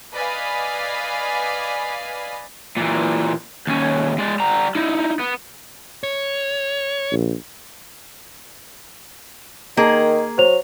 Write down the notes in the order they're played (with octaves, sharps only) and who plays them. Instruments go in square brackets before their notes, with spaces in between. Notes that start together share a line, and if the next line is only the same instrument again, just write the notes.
[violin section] B4 D5 D#5 F5 G#5 B5
[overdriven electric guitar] A#2 E3
D#2 C#4
G#3 D5
G3 A#5
D#4 E4
B3
[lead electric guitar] C#5
[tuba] A#1
[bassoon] D#3 [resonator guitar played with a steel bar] A#3 G#4
[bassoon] F#3 [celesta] C5 F7